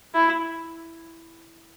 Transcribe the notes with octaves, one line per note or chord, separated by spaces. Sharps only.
E4